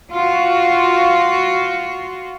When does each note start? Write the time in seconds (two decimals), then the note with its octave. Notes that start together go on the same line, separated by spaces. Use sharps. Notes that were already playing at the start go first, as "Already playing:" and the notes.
0.11 F4 F#4